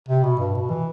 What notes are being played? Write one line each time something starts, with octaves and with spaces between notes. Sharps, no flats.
C3
B2
G2
B2
E3